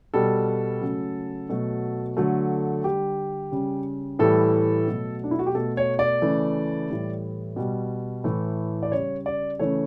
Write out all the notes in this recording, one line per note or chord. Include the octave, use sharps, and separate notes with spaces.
B2 G3 A4
C#3 F#3 A3
B2 F#3 A3
D3 F#3 A3
D3 G3 G4
C#3 G3
A2 E3 G3 A4
B2 F#3 A3
D4
E4
F#4
G4
B2 A3 A4
C#5
D5
C#3 E3 A3
A2 E3 G3
B2 G3
A2 E3 A3
D5
C#3 G3 C#5
D5
C#3 E3 A3 C#5